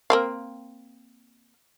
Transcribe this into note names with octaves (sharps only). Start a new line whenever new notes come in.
A#3 C4 F5